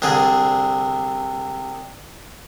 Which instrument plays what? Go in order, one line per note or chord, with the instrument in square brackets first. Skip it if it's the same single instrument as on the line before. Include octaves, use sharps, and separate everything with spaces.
[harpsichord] C2 D3 G#4